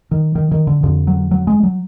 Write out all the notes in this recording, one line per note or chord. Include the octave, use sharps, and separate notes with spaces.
D#3
D#3
D#3
D3
F2 D3
F#3
F#3
G#3
F#3